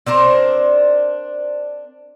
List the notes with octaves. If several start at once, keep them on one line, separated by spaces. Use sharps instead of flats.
C4 D4 A#4 C5